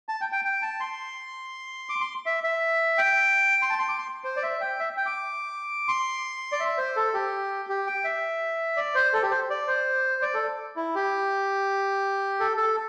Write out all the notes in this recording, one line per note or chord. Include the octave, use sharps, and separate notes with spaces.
A5
G5
G5
G5
A5
C6
D6
C6
E5
E5
G5
C6
A5
C6
D6
C6
C5
D5
E5
G5
E5
G5
D6
C6
D5
E5
C5
A4
G4
G4
G5
E5
D5
C5
A4
G4
C5
D5
C5
D5
A4
E4
G4
A4
A4